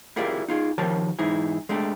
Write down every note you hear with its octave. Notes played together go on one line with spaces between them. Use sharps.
E4 F4 G4 G#4 A#4 D5
D#4 F4 G#4
D#3 F3 G4 A#4 C#5 A5
G#2 E3 D#4 E4 G#4
G#3 A3 D4 G4